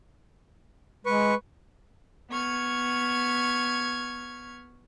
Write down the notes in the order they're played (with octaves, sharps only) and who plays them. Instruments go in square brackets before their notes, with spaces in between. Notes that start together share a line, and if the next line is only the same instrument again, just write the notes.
[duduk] G#3 [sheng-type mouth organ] B4 C#6
[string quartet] B3 C#6 F6 G#6